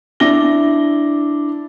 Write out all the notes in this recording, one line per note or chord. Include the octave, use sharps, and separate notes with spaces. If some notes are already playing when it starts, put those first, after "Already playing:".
D4 E4 A#6 G7